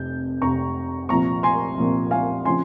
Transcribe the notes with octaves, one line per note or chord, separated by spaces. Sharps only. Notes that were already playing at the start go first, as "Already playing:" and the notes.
Already playing: F1 F2 C3 G6
F1 F2 C3 A#5 C#6
C2 A#2 F3 A#5 C#6
G#5 C6
C2 A#2 F3
F5 G#5
C#3 F3 C4 G#5 C6